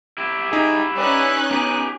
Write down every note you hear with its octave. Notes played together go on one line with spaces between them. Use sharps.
E4 G4
D#4 G#4
C#4 D#4 B4 D5 F#6
B3 G4 G#4 A#5 D7